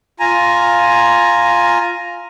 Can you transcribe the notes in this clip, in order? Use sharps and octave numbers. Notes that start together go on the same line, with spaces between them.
F4 G#5 A#5